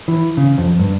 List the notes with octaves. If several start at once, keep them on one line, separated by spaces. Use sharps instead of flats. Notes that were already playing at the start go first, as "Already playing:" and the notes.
E3
C#3
F2
G2